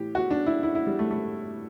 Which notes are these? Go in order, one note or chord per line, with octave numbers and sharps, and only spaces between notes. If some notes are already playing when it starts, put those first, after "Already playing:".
Already playing: A2 E3 G4
F#4
D4
E4
E4
E4
G3
A3
A3